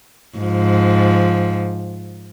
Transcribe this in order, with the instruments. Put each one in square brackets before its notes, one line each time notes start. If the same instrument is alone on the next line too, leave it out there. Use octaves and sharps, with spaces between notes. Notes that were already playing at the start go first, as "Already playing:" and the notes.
[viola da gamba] G#2 F3